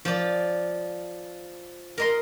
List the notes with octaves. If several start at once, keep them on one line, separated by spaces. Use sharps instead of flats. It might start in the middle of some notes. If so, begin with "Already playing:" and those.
F3 D5
A#4 D#5 C6